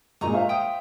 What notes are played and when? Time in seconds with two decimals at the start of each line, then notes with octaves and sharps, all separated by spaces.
0.21 G2 A#2 G#3 D#4 A#5 C#6
0.34 C5 E5 F5
0.49 G5 D#6